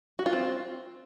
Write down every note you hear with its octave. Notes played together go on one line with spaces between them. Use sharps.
F#4
F4
C4